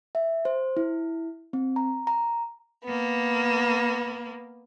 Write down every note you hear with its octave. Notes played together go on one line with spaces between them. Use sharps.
E5
C5
E4
C4
A#5
A#5
A#3 B3